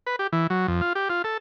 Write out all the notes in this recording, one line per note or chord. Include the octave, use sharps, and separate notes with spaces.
B4
G4
E3
F#3
F2
F4
G4
F4
A4